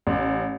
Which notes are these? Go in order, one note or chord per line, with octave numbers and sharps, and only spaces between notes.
A1